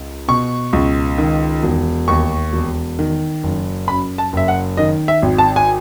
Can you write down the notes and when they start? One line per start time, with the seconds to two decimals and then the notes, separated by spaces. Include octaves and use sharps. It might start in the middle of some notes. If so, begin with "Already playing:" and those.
Already playing: C#2
0.28 B2 C#6
0.73 C#2
1.18 D#3
1.63 E1
2.08 D#2 C#6
2.53 E1
2.99 D#3
3.43 F#1
3.88 F#2 B5
4.18 A5
4.33 F#1 E5
4.48 F#5
4.77 D#3 D#5
5.08 E5
5.22 G#1
5.38 A5
5.56 G#5